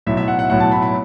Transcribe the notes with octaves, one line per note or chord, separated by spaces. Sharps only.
B1 A2 F#3 E5
E5
F#5
F#5
B1 A2 F#3 F#5
A5
B5
B5